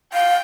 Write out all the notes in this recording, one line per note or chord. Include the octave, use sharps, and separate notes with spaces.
F5 G5